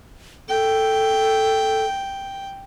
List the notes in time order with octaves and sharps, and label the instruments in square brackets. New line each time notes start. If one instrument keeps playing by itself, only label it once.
[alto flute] A4 [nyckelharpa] G5